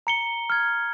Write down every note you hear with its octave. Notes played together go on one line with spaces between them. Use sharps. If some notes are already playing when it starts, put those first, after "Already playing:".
A#5 C#7 G7
F6 G#6